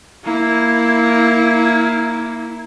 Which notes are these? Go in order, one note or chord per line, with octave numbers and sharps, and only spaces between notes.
A#3 E4